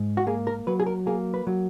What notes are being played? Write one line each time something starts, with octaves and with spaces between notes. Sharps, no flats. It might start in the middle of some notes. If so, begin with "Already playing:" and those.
Already playing: G#2
F#4
A#3 G#4
A#4
F#3 B4
G#4
A#4
A#3 G#4
B4
F#3